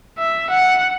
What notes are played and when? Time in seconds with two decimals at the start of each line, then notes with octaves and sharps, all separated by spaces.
0.18 E5
0.49 F#5